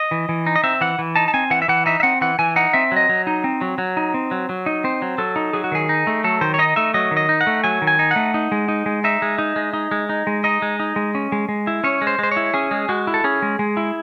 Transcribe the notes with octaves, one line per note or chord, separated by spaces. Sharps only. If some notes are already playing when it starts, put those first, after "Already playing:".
Already playing: D#5
E3
E3
D#4
D#5
C4 E5
E3 F#5
E3
D#4 A5
A5
C4 G#5
E3 F#5
E5
E3 F#5
D#4 E5
E5
C4 F#5
E3 F#5
E3 G#5
D#4 F#5
C4 E5
F#3 D#5
F#3
D#4
C4
F#3
F#3
D#4
C4
F#3
F#3
D#4
C4 C5
F#3
F#3 A4
D#4
F#3 G#4
F#4
D#3 G#4
D#4
A3
F#3 A4
D#3 C5
C#5
D#4 D#5
A3 E5
F#3 D#5
D#3
D#5
D#4
F#5
A3
F#3 G#5
D#3
G#5
D#4
F#5
A3
D#4
G#3
D#4
G#3
D#4 E5
G#3
D#4
G#3
D#4
G#3
D#4
G#3
D#4 D#5
G#3
D#4
G#3
C#4
G#3
G#3
E4
C#4 C#5
G#3
C5
G#3 C5
C#5
E4
C#4 G#4
G#3
G#3 F#4
E4
A4
C#4 G#4
G#3
G#3
E4